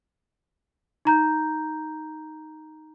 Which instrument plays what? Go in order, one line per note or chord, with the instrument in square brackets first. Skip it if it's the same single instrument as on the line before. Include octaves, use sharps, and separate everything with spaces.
[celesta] D#4 A#5 G6